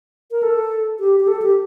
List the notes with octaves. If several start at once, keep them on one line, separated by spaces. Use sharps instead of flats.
A#4
A4
G4
G4
A4
G4